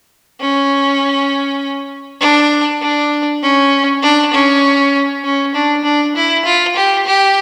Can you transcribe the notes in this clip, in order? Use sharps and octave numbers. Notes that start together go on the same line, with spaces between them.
C#4
D4
D4
C#4
D4
C#4
C#4
D4
D4
E4
F4
G4
G4